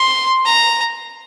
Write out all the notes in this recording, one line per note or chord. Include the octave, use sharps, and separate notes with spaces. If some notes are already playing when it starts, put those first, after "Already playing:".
Already playing: C6
A#5